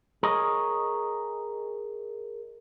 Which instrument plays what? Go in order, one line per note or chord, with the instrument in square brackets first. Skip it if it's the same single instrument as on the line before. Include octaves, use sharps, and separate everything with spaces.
[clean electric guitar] G#4 A#4 C#5 D#5